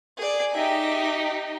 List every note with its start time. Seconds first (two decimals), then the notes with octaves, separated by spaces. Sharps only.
0.17 G#4 D5
0.53 D#4 G4 E5